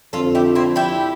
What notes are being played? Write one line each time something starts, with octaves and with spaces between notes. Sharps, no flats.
F2 D3 F3 F4 A4
E4 G4
C4 E4
E4 G4